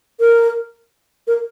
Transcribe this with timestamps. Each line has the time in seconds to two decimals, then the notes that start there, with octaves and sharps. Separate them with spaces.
0.20 A#4
1.27 A#4